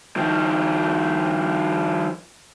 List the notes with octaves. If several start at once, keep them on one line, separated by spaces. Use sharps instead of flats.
D#3 F3